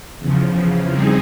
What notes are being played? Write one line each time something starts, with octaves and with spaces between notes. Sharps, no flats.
E2 C#3 F3
G3 C4 D#4 G#4